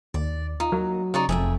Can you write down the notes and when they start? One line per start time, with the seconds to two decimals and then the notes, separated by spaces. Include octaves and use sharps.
0.14 D#2 D5
0.60 D#4 F4
0.72 F#3 A#3
1.14 C#3 D#4 D5 C#6
1.29 F1 F2 G#4 E5 G5